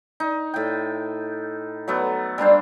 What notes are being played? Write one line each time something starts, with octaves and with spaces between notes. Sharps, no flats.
D#4
A2 G5
F#3 A3 B3
G3 A#3 D4 C5